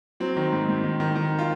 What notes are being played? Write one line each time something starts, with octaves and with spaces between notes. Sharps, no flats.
F#3 C4
D#3
G#2
G#2
D#3
D#3
D#3
F4